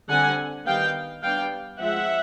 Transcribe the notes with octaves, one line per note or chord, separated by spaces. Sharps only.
D3 G3 C4 F#5 G#5
D#3 G3 B3 F5 G5
G3 B3 D4 F5 G5
F3 G#3 C4 E5 F#5